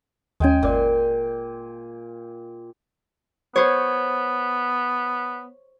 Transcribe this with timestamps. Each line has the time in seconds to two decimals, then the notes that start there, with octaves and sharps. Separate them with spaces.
0.40 D#2 G#3 C#4 G5 G#5
0.63 G1 A#2 D5
3.56 B3 C5 C#5